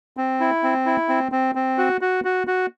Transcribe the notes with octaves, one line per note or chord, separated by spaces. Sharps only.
C4
E4
C4
E4
C4
C4
C4
F#4
F#4
F#4
F#4